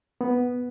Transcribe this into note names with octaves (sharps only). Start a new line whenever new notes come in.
B3